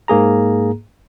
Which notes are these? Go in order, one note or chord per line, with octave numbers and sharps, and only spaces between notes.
G#2 A#3 G#4 A#5